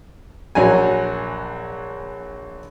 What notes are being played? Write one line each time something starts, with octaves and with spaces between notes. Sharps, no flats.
A#1 F#3 G#5